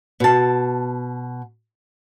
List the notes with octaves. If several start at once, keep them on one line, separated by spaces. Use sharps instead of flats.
B2 A5